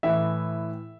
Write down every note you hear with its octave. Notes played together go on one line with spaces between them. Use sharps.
A2 E3 E5